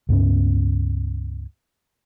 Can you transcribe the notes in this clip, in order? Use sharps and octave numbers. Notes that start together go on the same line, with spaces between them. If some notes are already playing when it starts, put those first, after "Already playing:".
C#2 G2 B3 C#4